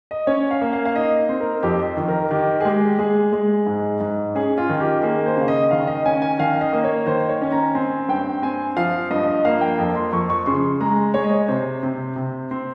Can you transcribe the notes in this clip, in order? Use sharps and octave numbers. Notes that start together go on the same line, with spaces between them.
D#5
C#4 C#5
F5
A#3
F5
F5
D#4 D#5
C4
A#4
F2 G4
D#3
A#4
D#3 G4
G#4
G#3 G4
G#3 G#4
G#3
G#2
G#2
C#4 G#4
F4
D#3
G4
A#3 G#4
C5
C#3 F5
D#5
D#3 F5
D#5
C#4 G#5
G#5
D#3 F5
D#5
A#3
C#5
D#3 C5
C#5
C#4
A#5
C4 G#5
G2 G5
C4 G#5
F3 F5
G2 D#5
D#5
A#3 F5
G5
F2
C6
F2 C#6
C#6
C#3 C6
G#3 A#5
G#3 C#5
D#5
C#5
C3 C5
C3
C3
C4